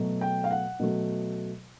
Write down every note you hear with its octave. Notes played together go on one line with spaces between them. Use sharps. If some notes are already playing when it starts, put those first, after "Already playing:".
Already playing: B2 F#3 A3
G5
F5
F#5
B2 F#3 A3